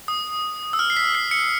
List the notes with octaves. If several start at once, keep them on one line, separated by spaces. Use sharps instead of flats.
D#6
E6
F6
C7
B6
C7
C#7